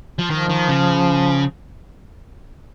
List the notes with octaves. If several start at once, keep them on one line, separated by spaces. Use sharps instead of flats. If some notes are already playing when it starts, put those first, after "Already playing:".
F3
D#3 F3
D#3
C#3